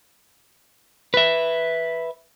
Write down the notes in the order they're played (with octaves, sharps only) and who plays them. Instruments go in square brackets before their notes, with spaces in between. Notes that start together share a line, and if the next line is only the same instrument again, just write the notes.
[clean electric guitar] B4 E5